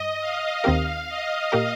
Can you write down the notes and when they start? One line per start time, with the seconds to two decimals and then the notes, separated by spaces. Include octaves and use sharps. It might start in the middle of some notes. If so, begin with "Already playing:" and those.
Already playing: G2 D#5
0.21 F5
0.64 D#2 D#3 C4 G4 A#4
1.09 D#5
1.52 A#2 A#3 G4 A#4